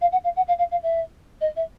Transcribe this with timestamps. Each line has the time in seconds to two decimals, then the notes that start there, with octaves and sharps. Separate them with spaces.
0.01 F5
0.12 F#5
0.24 F5
0.36 F#5
0.47 F5
0.58 F5
0.71 F5
0.82 E5
1.40 D#5
1.56 E5